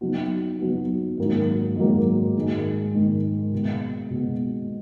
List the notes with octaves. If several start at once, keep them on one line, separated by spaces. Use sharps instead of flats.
F#3 B3 D#4 F#4
F#3 B3 D#4 F#4
G#2 D#3 F#3 A#3
G#2 D#3 F#3 A#3
G#2 D#3 G#3
G#2 D#3 G#3
B2 G#3 B3
B2 G#3 B3